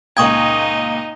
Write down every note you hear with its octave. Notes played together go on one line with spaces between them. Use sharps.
C#2 A#2 D#4 D#5 G5 C#6 D#6 G#6